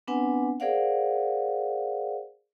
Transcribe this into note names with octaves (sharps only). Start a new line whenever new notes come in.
B3 C4 D4 B4 F#5 G#5
G#4 A#4 C5 D5 F5 F#5